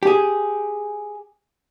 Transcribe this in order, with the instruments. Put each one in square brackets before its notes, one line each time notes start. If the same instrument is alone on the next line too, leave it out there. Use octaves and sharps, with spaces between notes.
[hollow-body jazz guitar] G4 G#4